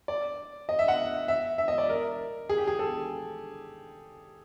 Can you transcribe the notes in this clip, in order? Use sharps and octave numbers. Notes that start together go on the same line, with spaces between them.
D5
D#5
E5
F#5
E5
E5
D#5
D5
A#4
G#4
G4
G#4
A4